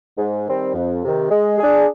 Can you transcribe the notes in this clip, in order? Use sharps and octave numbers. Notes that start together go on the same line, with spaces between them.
G#2
D#3 G3 C4
F2
C3 D#3
G#3
D4 G#4